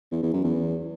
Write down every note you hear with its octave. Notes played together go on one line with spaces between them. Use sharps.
E2
E2
F#2
E2